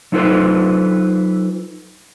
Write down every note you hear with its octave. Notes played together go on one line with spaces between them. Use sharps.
F#3 D#4 F4 A4 B4 C5